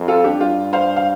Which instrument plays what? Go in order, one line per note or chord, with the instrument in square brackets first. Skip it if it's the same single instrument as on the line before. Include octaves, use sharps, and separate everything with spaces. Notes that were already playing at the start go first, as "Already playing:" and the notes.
Already playing: [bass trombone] F2
[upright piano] F4 A4
D4 G4
[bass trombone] G2 [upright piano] F4
[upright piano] C5 F5
F5